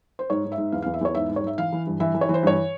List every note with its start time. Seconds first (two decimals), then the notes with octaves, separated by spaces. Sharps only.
0.19 C5
0.30 G#2 C#5
0.45 G#2
0.52 E5
0.58 G#2
0.72 E2 F5
0.82 E2 F5
0.94 E5
1.01 E2 C#5
1.15 G#2 E5
1.29 G#2
1.36 C#5
1.44 G#2 E5
1.58 E3 F5
1.72 E3
1.87 G2
2.00 E3 E5
2.15 E3
2.21 C#5
2.29 E3
2.34 C5
2.43 G2 C#5